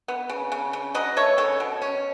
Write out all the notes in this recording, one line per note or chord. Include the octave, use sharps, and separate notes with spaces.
B3
C#3
C#3
C#3
F#3 B4 D#5
A3 A4 C#5
C#3 A4 C#5
B2
C#4